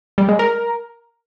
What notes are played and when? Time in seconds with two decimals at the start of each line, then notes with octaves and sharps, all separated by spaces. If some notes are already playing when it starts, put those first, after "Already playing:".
0.18 G3
0.29 G#3
0.39 A#4